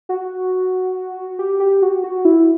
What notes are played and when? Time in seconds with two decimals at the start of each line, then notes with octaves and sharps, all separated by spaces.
0.09 F#4
1.39 G4
1.60 G4
1.82 F#4
2.04 F#4
2.25 E4